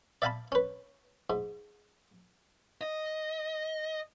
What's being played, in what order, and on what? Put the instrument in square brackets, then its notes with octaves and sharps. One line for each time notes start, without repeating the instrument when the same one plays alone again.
[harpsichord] D5 E5 F5 G#5 A5 B5
C#4 B4
G#2
[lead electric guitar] D#5